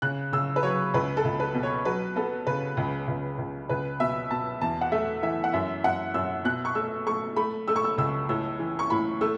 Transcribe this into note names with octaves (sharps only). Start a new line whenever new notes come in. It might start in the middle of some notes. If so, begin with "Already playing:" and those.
C#3 F#6
C#3 E6
B4
F#3 C#5
C#2 B4
A4
C#2
B4
B2
C#5
F#3 B4
B3 A4
C#3 B4
C#2
C#2
C#2
C#2 B4
B2 E5
B2 A5
E2 A5
F#5
A3 E5
E3 E5
F#5
F#2 E5
F#2 F#5
F#2 E6
B2 F#6
C#6
A3 E6
A3 C#6
A3 B5
A3 E6
C#6
E6
C#2 E6
A2 E6
E3
C#6
A2 B5
A3 E6